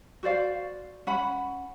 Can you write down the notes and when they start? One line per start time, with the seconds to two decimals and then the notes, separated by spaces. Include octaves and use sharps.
0.23 F#4 C5 D5 F5
1.07 C#4 F#5 B5